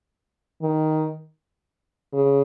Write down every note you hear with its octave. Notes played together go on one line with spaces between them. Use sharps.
D#3
C#3